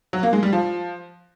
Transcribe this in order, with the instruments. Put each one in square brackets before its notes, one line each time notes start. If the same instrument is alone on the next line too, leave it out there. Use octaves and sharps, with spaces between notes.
[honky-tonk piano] F#3
A#3
G#3
G3
F3